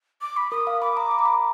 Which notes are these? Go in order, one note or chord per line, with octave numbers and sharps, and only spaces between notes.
D6
B5
A#4 D#6
F5
B5 D6
A#5
B5
A#5
B5